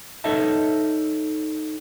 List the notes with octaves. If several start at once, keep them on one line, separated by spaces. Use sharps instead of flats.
D#4 A4 C#5 D#5 E5 A5